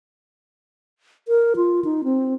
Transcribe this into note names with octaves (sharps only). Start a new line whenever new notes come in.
A#4
F4
D#4
C4